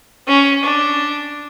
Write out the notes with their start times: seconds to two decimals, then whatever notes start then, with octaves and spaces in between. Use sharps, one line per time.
0.28 C#4
0.64 D4